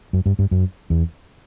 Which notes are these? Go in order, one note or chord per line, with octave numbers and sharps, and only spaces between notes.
F#2
G2
G2
F#2
E2